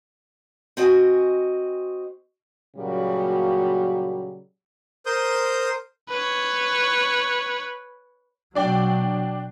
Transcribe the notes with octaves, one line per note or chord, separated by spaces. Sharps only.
C4 F#4 D#5 G#5
A#2 C#3 F#3 G3 A#3 F#4
A#4 C5 C6 D#6 G6
B4 C#5
B2 F#3 D4 D5 G5